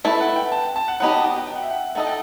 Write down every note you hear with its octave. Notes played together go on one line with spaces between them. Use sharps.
A3 E4 B4 E5
F#5
G5
A5
A5
F#5
F#3 B3 D#4 G4 F#5
A5
G5
G5
G5
F#5
E5
F#5
A3 D#4 A4 D#5 F#5
G5